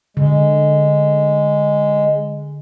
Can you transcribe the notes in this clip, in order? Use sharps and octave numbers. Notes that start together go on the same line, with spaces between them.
D3 G#3